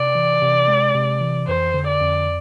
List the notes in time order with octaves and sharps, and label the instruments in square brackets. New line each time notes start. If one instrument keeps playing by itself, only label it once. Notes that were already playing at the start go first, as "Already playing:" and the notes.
Already playing: [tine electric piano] C3 [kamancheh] D5
[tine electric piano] E3
C3
G#3
C3
E3
[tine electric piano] F2 [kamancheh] C5
[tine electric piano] D3
[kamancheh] D5
[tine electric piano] F2